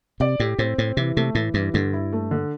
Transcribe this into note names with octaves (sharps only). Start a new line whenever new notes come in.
C3 D5
A2 G4
A2 C4
A2 C4
C3 E3
C3 A3
A2 E3
G2 E3
G2 D3
E4
A3
D3